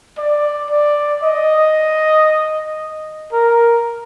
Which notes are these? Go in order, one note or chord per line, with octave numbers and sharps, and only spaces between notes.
D5
D5
D#5
A#4